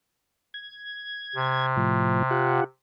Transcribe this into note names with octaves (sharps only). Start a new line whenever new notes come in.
G#6
C3
A2 F3
F4 G4 F#5